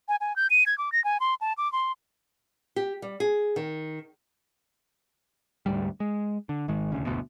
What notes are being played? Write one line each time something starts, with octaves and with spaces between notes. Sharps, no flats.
G#5
G#5
G6
D#7
G#6
D6
A#6
G#5
C6
A5
D6
C6
G4
G3
G#4
D#3
D2 G#2 G3
G#3
D3
G#1 D#3 G#3
E1 D2 C#3
F#1 D2 B2